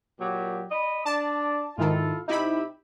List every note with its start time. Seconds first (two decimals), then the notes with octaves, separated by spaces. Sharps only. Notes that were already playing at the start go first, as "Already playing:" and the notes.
0.20 A#2 F#3 G4
0.71 D5 D#5 B5
1.06 D4 D5 A5
1.78 G#2 D#3 E4 F4 A4
2.28 C3 D#4 E4 G4 E5 B5